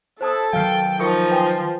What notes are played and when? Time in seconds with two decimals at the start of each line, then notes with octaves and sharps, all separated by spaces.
0.21 E4 A4 C5 A5 D#6
0.53 D#3 F#3 F5 G5 F6 C7
1.00 F3 D#4 A#4 C#6 C#7
1.31 B4 G5 G#5